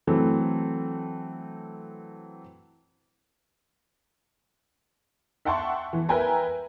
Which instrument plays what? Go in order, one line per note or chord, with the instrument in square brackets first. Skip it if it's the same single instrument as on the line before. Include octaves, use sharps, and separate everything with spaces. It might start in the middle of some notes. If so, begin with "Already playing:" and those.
[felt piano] E3 F#3 A3 C4
[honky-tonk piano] E5 F#5 G5 A5 C6 C#6
E3
A#4 B4 E5 G5 G#5 A#5